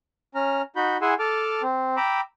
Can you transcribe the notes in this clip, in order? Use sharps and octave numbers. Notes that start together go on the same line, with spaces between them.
C#4 A#5 F6
D#4 F#4 B5 G6
E4 G#4 F#5 G#5 C6 E6
A4 A5 D6 F6
C4
G5 A#5 B5 D6 E6